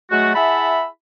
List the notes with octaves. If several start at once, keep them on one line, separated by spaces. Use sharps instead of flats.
F#3 G#3 A3 F#4
E4 G#4 E5 F#5 A5 B5